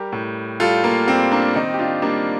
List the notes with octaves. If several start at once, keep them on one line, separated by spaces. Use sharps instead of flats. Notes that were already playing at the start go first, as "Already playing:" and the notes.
Already playing: G3 G4 A#4
A2
G3 F4 A4
A#3
G3 C4
A#3 D4
D#3 C4 D#4
G4
D4 F4
G3 A#3 D4